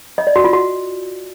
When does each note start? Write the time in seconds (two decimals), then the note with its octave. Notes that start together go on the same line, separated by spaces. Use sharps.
0.18 D#5
0.27 D5
0.36 F#4
0.44 F4
0.53 F#4